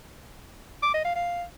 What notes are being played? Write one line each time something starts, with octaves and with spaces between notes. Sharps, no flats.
D6
D#5
F5
F5